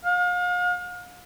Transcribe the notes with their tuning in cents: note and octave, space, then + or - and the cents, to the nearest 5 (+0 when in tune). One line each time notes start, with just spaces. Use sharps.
F5 +40